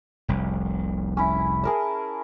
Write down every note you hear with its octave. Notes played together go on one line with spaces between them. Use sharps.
F1 C2
C#4 E4
G#4 A#4 A5